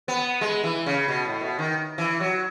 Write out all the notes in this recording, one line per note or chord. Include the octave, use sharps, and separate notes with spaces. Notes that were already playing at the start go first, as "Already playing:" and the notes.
B3
G#3
E3
C#3
B2
A2
B2
D#3
E3
F#3